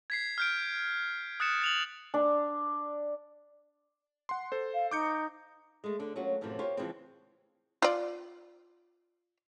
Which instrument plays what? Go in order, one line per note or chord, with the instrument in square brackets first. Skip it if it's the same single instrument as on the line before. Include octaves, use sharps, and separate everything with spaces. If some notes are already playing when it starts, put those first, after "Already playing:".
[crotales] G#6 B6 C7
F6 G6 D7
D#6 F#6 A6 C#7 E7
A6 F7 F#7
[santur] D4
[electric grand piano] F#5 C6
A4 C5
[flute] F5
[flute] D#4 [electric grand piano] D6 G6 C#7
[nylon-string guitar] G#3 A3
D3 D4
F#3 A3 A#3 C#4 F4 F#4
F#2 A2 C3 E3 F3
F4 G4 A#4 C5 C#5
C#3 E3 F3 G#3 C4
[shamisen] F4 D5